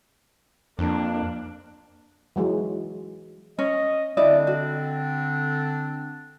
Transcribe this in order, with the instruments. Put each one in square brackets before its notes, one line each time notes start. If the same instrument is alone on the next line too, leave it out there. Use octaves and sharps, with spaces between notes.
[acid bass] F2 [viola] A#3 D4
[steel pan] E3 F#3 G#3
[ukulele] C#4 [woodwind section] D#5
[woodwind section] D3 C4 D4 [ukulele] E4 D5 D#5
[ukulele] F#4